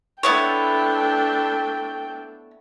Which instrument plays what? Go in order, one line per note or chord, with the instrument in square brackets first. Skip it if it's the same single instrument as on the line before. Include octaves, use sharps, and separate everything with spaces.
[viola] A3 D4 [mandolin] B3 E4 C#5 [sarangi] G5